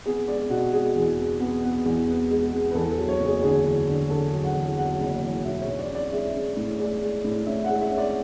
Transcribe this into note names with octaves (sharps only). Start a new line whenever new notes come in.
B3 G#4
G#3 D5
B2 F#4
G#3 G#4
E2
B3
B3
B3
E2
B3
G#3
B3
B4
E2 A4
A4
F#3
C#5
F#1
G#4
D3 G#4
E2
D3
D3 A4
F#3
F#5
E2
F#3 F#5
F#1
E2
B1 E5
C#5
B1
D5
C#4 D5
G#3 E5
C#4
A2
G#3 D5
G#3
A2
C#4 E5
F#5
G#3
E5
C#4
D5